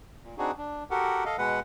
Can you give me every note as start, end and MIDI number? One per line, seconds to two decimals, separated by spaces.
0.24 0.35 46
0.38 0.51 60
0.38 0.51 62
0.38 0.51 63
0.38 0.51 66
0.38 0.51 68
0.58 0.84 62
0.91 1.24 66
0.91 1.24 67
0.91 1.24 69
0.91 1.24 70
0.91 1.24 78
1.26 1.36 69
1.26 1.36 75
1.26 1.36 77
1.38 1.60 47
1.38 1.60 56
1.38 1.60 71
1.38 1.60 78